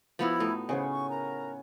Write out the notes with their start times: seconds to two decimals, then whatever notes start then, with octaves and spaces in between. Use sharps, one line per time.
0.19 F3 B3 E4 F#4 E5
0.40 A2 D#4
0.69 C#3 B3 C#4 C5 F#5 G#5
0.90 C#6
1.09 A#4 A#5